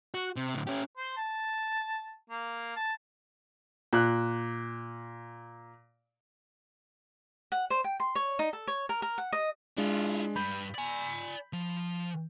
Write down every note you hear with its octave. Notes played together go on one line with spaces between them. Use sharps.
F#4
C3
A2 D3
C#4 G4
C5
A5
A#3
A5
A#2 F#6
F#5
C5
G5
C6
C#5
D#4
A4
C#5
A#4
A#4
F#5
D#5
G#3 D4 E4 F4
G2 B5 G6
D5 G#5
F3